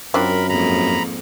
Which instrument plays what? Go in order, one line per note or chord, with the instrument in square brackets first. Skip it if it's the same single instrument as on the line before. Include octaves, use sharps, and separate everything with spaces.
[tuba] F#2 [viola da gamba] F#3 [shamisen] C4 D4 F4 [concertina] A#4 B5
[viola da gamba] F2 G#2 A#3 [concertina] A#5 B5